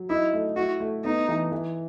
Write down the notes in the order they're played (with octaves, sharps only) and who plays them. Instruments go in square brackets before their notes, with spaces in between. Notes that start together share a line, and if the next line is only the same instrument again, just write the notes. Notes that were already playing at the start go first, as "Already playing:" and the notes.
Already playing: [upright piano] F#3
[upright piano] D#4 [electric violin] E4
[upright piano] A3
[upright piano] E4 [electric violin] F#4
[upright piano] A3
[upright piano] B3 [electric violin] D#4
[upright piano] E3
E3